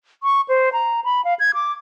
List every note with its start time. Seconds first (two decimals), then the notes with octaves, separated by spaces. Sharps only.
0.23 C#6
0.49 C5
0.73 A#5
1.05 B5
1.25 F5
1.40 G#6
1.54 D6